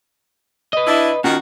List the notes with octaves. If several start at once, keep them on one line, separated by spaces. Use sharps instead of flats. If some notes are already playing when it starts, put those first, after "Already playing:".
B4 D#5
D4 E4
D#3 C#4 D#4 F4 F#4